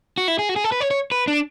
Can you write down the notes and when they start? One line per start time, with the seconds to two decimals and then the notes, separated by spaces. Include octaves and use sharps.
0.18 F#4
0.28 E4
0.39 G#4
0.49 F#4
0.56 G#4
0.64 A4
0.72 B4
0.81 C#5
0.91 C#5
1.12 B4
1.28 D4